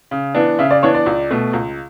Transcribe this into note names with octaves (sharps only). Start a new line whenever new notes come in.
C#3
E3 B3 D4
C#3 E5
D5
E3 B3 D4 C#5
D5
C#2
B2 A3
C#2